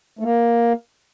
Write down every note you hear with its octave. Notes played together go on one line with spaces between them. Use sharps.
A3
A#3